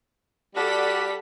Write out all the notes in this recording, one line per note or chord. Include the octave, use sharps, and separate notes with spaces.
G3 F#4 A4 D5 F#5 B6